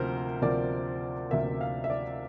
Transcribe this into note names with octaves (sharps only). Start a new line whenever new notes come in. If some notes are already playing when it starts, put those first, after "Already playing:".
Already playing: D2 C3 F3 A#3 A#4 C5
D2 C3 F3 A#3 D5
D2 C3 F3 A#3 E5
F5
E5
D5